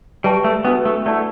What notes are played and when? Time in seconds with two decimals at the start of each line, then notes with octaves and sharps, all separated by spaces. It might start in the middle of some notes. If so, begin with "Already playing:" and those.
0.24 G3 G4 B4 E5 A5 C#6
0.44 A3
0.65 B3 D4 F#4 B4
0.85 A3
1.06 A3 E4 A4 D5 F#5 A5